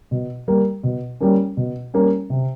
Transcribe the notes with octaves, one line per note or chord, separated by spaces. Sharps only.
B2
G3 A#3
B2
G3 A#3 C#4
B2
G3 A#3 C#4
C3